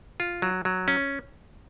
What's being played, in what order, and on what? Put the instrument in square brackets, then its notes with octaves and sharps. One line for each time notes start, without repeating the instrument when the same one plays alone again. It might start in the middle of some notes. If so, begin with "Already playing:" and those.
[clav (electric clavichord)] F4
F#3
F#3
C#4